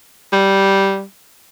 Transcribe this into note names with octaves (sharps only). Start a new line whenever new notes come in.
G3